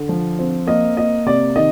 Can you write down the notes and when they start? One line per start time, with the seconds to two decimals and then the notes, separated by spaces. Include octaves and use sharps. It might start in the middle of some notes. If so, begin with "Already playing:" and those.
Already playing: D3
0.09 F3
0.39 C4
0.67 A#3 D#5
0.97 A#3 D#5
1.26 C3 D5
1.56 D#3 D#5